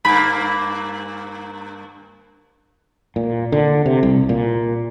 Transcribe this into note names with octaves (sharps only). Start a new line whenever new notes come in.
G2 A#3 B5
A#2
D3
C3
C2
A#2